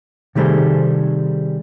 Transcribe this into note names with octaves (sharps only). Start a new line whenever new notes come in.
C3 D#3 G3 A3 G#4 C5